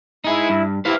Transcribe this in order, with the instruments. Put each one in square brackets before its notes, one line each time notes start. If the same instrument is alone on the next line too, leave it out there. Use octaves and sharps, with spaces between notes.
[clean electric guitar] D#4 G#4 [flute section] E4
[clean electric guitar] G2
[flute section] E4 G4 [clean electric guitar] B4 C5 F5